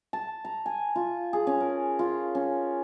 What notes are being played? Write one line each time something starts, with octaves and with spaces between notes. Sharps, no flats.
A5
A#5
G#5
F4
G#4
C#4
A#4
F4
C#4